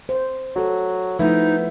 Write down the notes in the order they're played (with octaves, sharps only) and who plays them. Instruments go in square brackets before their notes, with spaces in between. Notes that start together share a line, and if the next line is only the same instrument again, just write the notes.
[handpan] C5
[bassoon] F#3 [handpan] F#4 A4
[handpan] F3 A3 [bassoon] B3 [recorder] D#4 [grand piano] E4